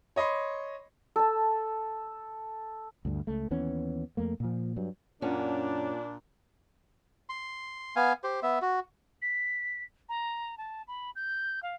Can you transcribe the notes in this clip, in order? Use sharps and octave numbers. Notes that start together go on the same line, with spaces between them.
C#5 D#5 B5 C6
A4 A5
D2 G2 D3
C#2 A3
D#2 E3 B3 C#4
F2 A3 A#3
A#2 F3
G2 F#3
F#2 A#2 C#4 D4
C6
B3 F5 G#5
G4 C5
B3 E5
F#4
B6
A#5
A5
B5
G6
F5